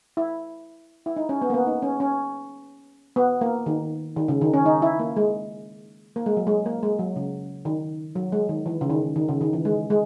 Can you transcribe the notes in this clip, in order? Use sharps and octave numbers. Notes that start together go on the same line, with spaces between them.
E4
E4
D#4
C#4
B3
A#3
B3
D#4
C#4
C#4
B3
A#3
D#3
D#3
C#3
D#3
C#4
D#4
E4
A#3
G#3
A#3
G#3
F#3
G#3
A#3
G#3
F#3
C#3
D#3
F#3
G#3
D#3
E3
C#3
D#3
D#3
C#3
D#3
E3
G#3
G#3